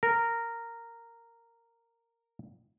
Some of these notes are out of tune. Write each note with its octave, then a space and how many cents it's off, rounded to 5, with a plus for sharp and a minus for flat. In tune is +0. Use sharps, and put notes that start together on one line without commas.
A#4 -10